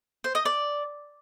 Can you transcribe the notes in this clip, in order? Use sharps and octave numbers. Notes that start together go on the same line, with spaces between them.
C5
D#5
D5